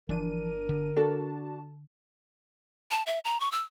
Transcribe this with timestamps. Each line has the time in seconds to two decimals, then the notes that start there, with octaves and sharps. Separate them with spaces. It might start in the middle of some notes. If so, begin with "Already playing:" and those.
0.09 G1 E3 F3 D4 A#4 D#7
0.69 D3
0.96 D4 F#4 A4 A5
2.91 A5
3.06 E5
3.25 A#5
3.40 C#6
3.52 E6